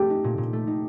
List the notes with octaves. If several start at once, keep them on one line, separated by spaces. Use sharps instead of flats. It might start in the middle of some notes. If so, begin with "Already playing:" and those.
Already playing: A3 G4
D#4
A#2
A#2
A3
D#4